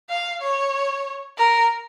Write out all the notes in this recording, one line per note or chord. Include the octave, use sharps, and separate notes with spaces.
F5
C#5
A#4